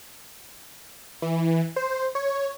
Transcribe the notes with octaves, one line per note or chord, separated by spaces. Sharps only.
E3
C5
C#5